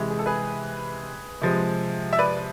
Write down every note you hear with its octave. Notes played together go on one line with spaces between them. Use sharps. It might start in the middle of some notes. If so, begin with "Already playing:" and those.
Already playing: C3 E3 G#3
G#4
A4
G#4 B4
C3 F3 G#3
E5
B4 D5